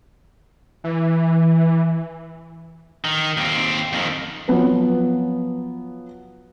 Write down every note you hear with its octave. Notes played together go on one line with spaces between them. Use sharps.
E3
D#3
D#2 C4
F2 D#3
F3 F#3 B3 B4